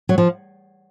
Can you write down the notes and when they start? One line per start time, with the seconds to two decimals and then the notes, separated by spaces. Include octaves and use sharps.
0.09 F#3
0.18 F3